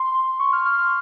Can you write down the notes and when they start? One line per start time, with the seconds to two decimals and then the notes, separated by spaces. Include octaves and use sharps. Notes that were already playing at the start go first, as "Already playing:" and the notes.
Already playing: C6
0.39 C#6
0.53 F6
0.66 F6
0.78 F6